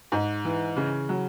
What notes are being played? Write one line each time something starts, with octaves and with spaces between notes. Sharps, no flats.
G#2
E3
C#3
F#3